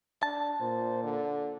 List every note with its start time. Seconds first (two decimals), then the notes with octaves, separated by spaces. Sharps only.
0.23 D4 A5
0.61 A#2 C5
1.04 D3